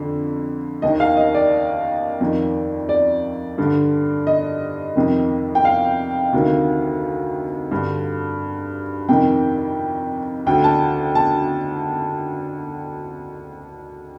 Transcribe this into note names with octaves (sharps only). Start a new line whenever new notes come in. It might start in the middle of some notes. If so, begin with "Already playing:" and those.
Already playing: F2 D3
D#2 D#3 D#5
F5
D#5
D5
F2 D#3
D5
G2 D3
D#5
F2 C3 D#3
G5
F5
D2 C3 D#3
G2 D3
F2 C3 D#3 G5
D2 D3 G5
A5
A5